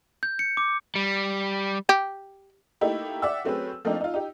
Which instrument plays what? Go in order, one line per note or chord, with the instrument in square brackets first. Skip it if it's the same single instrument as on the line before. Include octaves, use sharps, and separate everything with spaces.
[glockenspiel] G6
C#7
D6
[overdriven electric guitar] G3
[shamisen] G4
[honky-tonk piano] A3 A#3 D#4 E4 G4
D5 E5 F#5 G5 E6
F#3 A3 C4 C#4 G#4 B4
F3 A3 A#3 C4 D4 D#4
D#4 F4
D#4 G4